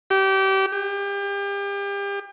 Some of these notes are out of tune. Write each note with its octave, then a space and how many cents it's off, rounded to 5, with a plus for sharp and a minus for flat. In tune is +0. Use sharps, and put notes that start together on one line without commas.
G4 -25
G4 +35